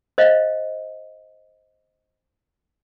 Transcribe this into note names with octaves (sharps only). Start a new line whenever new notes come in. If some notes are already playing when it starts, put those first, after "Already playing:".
C5 D#5 F5